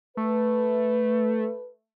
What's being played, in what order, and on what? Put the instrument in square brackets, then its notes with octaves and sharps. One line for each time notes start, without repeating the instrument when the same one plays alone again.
[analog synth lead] A3 [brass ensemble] B4